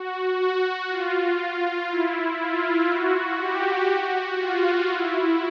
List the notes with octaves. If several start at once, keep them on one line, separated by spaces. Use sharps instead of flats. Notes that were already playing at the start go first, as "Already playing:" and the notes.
Already playing: F#4
F#4
F4
E4
F4
F#4
G4
F#4
F4
E4